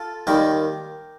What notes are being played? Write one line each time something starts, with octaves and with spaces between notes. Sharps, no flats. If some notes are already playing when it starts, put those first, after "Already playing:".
Already playing: F4 A4
D#2 D#3 G3 G4 A#4